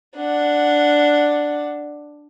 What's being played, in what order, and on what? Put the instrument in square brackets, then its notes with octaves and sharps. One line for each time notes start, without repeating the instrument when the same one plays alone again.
[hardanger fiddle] D4 F#5